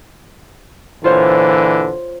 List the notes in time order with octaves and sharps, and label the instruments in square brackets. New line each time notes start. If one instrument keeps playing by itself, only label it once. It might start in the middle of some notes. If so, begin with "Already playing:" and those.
[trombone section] A#2 D3 E3 [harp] F4 C5 C#5